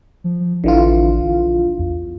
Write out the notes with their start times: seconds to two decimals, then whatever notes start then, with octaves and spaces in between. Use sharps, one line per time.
0.24 F3
0.64 A1 D3 E3 F4
1.21 A#1
1.78 E2